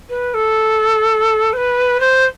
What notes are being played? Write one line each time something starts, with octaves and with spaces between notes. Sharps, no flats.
B4
A4
C5
B4
C5